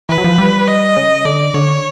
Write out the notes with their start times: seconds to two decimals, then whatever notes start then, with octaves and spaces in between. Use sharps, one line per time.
0.09 E3 B4
0.18 F#3
0.24 F3
0.38 G3
0.67 D#5
0.96 C#3
1.25 D3 D5
1.54 D3 C#5